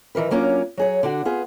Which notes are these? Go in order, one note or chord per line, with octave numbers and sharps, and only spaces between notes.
D#3 E3 A#4 B4
F#3 A#3 C#4 D4 F4
F#3 G#4 C#5
D3 D4 F#4
B3 F4 G#4